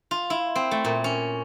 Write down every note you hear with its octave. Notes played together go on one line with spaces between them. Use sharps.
F4
E4
C4
A3
A#2
C#4